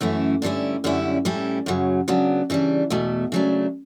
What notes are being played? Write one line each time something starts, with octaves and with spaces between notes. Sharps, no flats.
F#2 E3 A3 C#4 E4
G2 D3 G3 C#4 E4
F#2 D3 G3 C#4 E4
A2 G3 C#4 E4
F#2 C#3 F#3
C#3 F#3 B3 D4
C#3 E3 G3 D4
E2 B2 A3
C#3 F#3 A3 D4